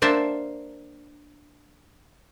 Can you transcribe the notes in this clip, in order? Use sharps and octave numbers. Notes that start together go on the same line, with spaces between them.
A#3 D4 C5 E5 A5